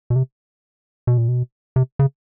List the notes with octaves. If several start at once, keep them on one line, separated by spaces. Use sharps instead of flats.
B2
C3
B2
A#2
B2
C3
C#3